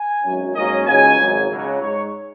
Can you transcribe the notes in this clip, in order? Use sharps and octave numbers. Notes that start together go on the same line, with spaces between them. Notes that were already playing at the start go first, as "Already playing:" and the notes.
Already playing: G#5
G#1 F#2 F#3 C#4
G#2 F#3 A#3 C#4 D#5
C#2 C#3 F#3 D#4 G#5
G#1 G#2 F#3
C#2 C#3 F#3
G#2 G#3 D#4 C#5